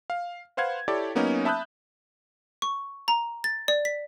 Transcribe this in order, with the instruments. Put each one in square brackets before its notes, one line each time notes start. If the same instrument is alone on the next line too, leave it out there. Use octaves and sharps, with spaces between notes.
[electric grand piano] F5
B4 C5 F5 F#5 G#6
E4 G4 A4 C#5 D5
F#3 A#3 B3 C#4 D#4
E5 A5 B5 D#6 F#6 G6
[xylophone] C#6
A#5
A6
D5
B6